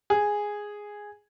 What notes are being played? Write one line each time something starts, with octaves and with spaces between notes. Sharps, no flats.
G#4